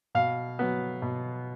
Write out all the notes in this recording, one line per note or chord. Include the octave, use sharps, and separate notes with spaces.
B2 F5
F#3 B3
B2